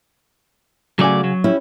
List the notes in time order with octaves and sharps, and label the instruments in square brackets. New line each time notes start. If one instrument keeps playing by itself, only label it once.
[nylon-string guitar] C#3 F#4 G#5 [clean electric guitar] F#3 A3 D5
[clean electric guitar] F#3
[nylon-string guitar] C#4 E4 G4